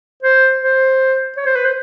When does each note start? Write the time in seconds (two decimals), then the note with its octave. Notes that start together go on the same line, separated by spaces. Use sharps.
0.23 C5
0.61 C5
1.37 C#5
1.46 C5
1.55 B4
1.65 C5